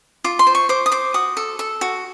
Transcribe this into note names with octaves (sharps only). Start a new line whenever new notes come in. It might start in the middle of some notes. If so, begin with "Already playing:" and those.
F4 D6
C6
C5
C#6
C5 D6
D#6
C5 D6
F#4 D#6
A4
A4
F#4